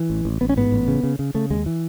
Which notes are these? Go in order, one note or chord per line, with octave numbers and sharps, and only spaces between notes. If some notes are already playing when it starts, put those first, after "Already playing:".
Already playing: E3
A1
A1
A1 B3
C#4
G#2 B3
A1
C#3
C#3
C#3
C#3 A3
D#2 G#3
E3